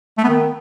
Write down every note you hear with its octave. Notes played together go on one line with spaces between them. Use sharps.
A3
B3
D#3